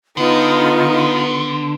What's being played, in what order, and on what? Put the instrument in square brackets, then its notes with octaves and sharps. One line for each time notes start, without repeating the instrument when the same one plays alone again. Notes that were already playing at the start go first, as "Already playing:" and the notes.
[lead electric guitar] D3 [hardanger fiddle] B3 [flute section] D#4 F4